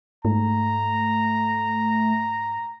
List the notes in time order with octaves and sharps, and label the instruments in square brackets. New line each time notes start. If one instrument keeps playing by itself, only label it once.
[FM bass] G#2 [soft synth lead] A3 [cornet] A#5